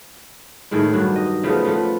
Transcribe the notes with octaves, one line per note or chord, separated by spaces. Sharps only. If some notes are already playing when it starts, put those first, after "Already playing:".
A2 D#3 G#3 E4
G2 D#3 F#3 F#4
D#5
C#3 F3 A3 B3
F3 A3 B3